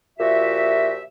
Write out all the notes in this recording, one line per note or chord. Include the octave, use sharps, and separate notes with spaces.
A#2 F3 F#4 G4 E5